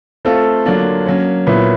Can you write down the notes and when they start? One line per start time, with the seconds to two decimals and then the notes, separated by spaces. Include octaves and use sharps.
0.25 A3 C4 F4 A4
0.65 D3 F#3 A#3 D4 F4
1.06 F#3 A#3 C#4
1.47 A#2 F#3 B3 E4